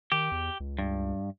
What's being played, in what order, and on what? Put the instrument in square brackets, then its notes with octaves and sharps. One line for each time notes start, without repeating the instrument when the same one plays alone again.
[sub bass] D#3 [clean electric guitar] G4
[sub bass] E2
C#2
[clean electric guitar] G2